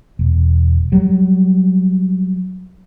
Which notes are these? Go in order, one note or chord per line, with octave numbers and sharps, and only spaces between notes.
E1
F#3 G3